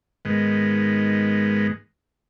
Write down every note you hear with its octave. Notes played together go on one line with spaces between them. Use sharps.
G#2 D#3 G#3 B3